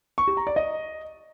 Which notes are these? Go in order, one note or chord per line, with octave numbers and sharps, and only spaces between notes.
C#6
G4
A#5
D5
D#5